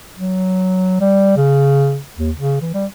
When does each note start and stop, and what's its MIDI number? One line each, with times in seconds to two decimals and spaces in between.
0.17 0.99 54
1.01 1.36 55
1.37 2.00 49
2.18 2.31 39
2.37 2.61 49
2.61 2.74 52
2.74 2.86 55